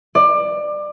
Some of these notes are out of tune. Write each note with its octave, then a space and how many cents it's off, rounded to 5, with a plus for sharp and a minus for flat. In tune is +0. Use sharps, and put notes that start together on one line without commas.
D5 +25